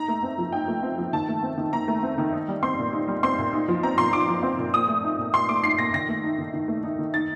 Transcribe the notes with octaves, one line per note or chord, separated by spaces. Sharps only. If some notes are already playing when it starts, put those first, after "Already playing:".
Already playing: D#4 A#5
A3
C4
F3
D#4 G5
A3
C4
F3
D#3 A5
A3
C4
D#3
D#3 A#5
A3
C4
D#3
D#4
G3
C4 C6
A#2
D#4
G3
C4 C6
A#2
D#4
F3
C4 A#5
A#2 C6
D#4 D6
F3
C4
A#2
A#2 D#6
A3
D#4
A#2
A#2 C6
A3 D6
D#4 C7
A#2 A#6
D#3 A#6
A3
D#4
D#3
D#3
A3
D#4
D#3
D#4 A6